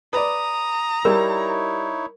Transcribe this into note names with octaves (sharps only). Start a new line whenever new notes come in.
B4 D5 A#5 D#6
G3 D#4 E4 A#4 C#5